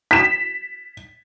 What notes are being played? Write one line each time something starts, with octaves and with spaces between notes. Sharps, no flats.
B6 E7